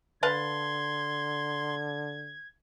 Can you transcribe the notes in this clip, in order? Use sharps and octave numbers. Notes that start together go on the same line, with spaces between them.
D3 B4 F5 A5 C6 G#6